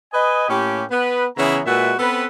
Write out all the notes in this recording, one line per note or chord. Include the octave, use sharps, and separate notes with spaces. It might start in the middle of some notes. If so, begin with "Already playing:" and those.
B4 D#5 G#5
A2 A#3 C#4 G4
B3 B4
C#3 E3 B3 C#4 E4 A#5
A#2 G#3 F#4 B4 E5
B3 C4 A4 B4